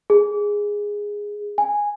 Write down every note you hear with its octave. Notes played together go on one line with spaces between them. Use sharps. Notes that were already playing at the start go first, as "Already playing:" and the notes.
G#4
G#5